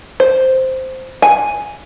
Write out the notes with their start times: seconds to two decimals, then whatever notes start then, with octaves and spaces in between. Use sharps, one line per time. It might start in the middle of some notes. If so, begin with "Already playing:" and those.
0.20 C5
1.22 G#5